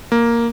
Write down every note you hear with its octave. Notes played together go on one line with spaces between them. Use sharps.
A#3